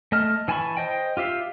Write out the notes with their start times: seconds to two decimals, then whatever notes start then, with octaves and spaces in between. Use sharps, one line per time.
0.12 A3 D#5 A5 F6
0.48 E3 G#5 A5 B5 C#6
0.77 C5 D#5 G5
1.17 F4 G4 E5 F5